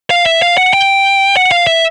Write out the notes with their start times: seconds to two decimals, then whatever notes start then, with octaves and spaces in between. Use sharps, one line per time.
0.10 F5
0.26 E5
0.42 F5
0.57 F#5
0.73 G5
1.37 F#5
1.51 F5
1.67 E5